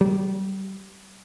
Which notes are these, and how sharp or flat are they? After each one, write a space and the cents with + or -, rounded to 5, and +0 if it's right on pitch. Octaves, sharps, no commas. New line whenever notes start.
G3 -30